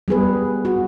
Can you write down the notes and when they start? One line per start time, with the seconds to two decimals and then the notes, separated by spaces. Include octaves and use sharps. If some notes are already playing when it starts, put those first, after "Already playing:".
0.08 G3 B3 G#4 B4
0.65 F#4